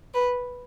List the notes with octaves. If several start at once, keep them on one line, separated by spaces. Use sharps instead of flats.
B4